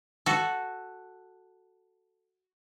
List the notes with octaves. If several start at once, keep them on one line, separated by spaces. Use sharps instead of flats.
F#4 A4